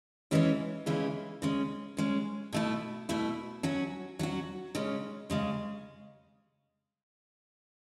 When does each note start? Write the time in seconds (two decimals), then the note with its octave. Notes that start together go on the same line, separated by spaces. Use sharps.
0.31 C#3 E3 G#3 C#4 E4
0.86 C#3 E3 G#3 C#4 E4
1.42 C#3 G#3 C#4
1.97 C#3 G#3 C#4
2.53 B2 A3 E4
3.09 B2 A3 E4
3.63 F#3 C#4 F#4
4.19 F#3 C#4 F#4
4.75 C#3 G#3 C#4
5.30 C#3 G#3 C#4